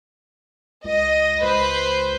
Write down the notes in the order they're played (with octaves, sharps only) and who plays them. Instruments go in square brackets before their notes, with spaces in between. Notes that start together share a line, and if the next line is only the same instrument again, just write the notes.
[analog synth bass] C#2 [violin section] D#5
[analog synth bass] C#2 [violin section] B4 C5